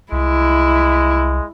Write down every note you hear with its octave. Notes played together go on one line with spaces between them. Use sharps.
C2 G#3 E4